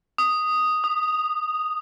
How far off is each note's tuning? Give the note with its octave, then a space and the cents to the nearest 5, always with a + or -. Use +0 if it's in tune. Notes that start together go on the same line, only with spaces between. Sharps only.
D#6 +0
D#6 -25